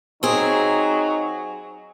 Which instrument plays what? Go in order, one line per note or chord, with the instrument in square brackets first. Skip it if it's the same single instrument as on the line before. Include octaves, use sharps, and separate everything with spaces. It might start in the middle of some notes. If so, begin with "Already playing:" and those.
[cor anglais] F#3 [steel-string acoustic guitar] C4 G#4 [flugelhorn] D#4